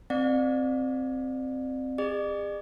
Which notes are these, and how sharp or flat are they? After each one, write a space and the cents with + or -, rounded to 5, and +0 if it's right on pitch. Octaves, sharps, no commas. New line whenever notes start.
C4 +0 D5 +30 F5 +35
G#4 -35 D5 +45 D6 -40